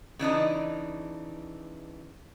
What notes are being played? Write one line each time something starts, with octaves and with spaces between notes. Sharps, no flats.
C#3 E3 D4 D#4